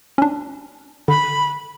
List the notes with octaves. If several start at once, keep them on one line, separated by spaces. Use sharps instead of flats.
C#4 D4
D3 B5